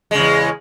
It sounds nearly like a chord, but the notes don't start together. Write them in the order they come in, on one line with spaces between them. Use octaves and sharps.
G#3 C#3 E2